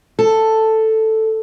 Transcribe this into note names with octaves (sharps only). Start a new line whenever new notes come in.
A4